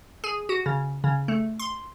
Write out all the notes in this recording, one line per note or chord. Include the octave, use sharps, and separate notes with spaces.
G#4
F#4
C#3
C#3
A3
C6